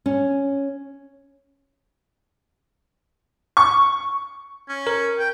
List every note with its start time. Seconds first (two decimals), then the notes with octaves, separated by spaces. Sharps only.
0.06 C#4
3.57 C#6
4.69 C#4
4.87 A#4
5.19 G5